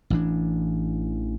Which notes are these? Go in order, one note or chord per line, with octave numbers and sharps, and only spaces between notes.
A1 E3 D4